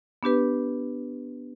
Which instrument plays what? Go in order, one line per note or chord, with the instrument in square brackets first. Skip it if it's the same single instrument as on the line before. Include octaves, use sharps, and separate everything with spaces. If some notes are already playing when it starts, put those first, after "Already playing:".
[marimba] B3 D4 G4 B4